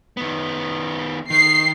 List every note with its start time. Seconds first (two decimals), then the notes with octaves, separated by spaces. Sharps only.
0.17 D#3 B3
1.30 D#3 C7